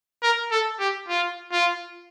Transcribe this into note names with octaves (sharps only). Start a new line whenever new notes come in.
A#4
A4
G4
F4
F4